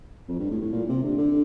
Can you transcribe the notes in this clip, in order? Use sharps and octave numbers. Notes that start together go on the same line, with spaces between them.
F2
G2
A2
A2
A#2
C3
D3
D3